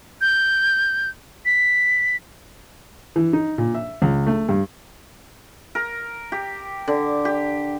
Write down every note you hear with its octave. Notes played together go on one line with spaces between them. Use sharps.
G6
B6
E3
D#4
A#2
E5
C#2
A3
G2
A#4
G4
D3
G4